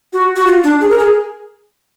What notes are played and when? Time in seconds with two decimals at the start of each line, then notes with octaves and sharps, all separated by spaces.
0.13 F#4
0.36 F#4
0.46 F4
0.64 D4
0.81 G#4
0.90 A#4
0.99 G#4